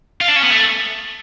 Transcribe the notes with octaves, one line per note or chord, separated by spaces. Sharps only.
F4
D4
C#4
B3
A3